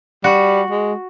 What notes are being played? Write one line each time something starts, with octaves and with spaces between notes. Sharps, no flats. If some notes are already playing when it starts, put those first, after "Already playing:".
G3 F#4
G#3